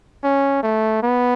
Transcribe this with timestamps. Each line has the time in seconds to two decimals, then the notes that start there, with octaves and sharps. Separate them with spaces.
0.24 C#4
0.63 A3
1.03 B3